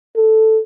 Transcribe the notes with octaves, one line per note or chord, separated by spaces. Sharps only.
A4